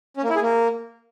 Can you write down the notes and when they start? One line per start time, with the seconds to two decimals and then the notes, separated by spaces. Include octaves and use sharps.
0.17 C#4
0.23 A#3
0.29 E4
0.36 G#4
0.42 A#3